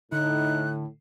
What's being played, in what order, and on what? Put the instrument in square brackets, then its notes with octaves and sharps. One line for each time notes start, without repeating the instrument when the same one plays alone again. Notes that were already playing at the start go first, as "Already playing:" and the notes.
[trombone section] A2 [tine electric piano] D3 [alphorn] D#4 [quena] F#6